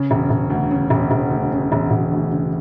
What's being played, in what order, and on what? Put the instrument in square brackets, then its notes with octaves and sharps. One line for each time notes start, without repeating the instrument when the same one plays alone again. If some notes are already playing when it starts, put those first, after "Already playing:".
Already playing: [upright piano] C#3
E1
E1
D2
C#3
E1
E1
D2
C#3
E1
E1
D2
C#3